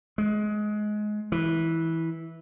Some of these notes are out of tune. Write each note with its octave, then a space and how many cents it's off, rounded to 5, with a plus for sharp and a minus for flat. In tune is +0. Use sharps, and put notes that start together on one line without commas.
G#3 +20
E3 -15